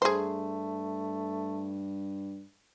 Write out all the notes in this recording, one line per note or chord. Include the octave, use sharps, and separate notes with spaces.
G2 A3 G#4 C5